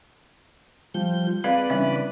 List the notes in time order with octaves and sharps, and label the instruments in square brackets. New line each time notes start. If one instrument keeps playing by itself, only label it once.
[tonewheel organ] F3 G6 [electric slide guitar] G3
[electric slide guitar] G#3 G#4 D#5 [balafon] C4 F5 [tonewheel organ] B4 D5 B5
[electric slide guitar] C#3 E3 D4 [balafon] G3 C#4 E5